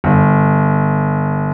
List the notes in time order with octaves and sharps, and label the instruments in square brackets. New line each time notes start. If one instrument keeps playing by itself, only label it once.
[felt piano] G1